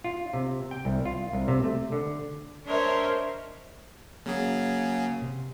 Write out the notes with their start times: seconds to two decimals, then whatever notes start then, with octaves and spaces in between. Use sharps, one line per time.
0.04 F4
0.33 C3
0.71 G5
0.85 C2
1.05 F4
1.33 C2
1.48 C3
1.64 A3
1.92 D3
2.65 D4 A#4 C5 C#5 D#5 E5
4.26 C#3 F#3 A#3 G#4
5.22 C3